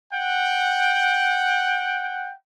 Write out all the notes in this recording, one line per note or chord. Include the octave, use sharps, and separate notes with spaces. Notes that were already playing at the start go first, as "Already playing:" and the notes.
F#5 G5